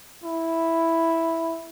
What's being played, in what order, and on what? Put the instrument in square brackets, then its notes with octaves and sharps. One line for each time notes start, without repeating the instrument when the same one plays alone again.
[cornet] E4